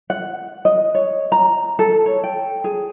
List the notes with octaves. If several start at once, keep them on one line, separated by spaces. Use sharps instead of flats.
F#5
D#5
C#5
A#5
A4
C#5
G5
G#4